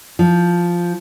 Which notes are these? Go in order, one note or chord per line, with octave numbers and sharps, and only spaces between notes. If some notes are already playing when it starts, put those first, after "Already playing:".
F3